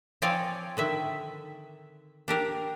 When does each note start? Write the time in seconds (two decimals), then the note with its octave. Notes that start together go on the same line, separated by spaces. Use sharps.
0.22 F3 C4 C#5 D5 F5 G#5
0.77 D3 D#3 E5
2.28 D4 G4 A#4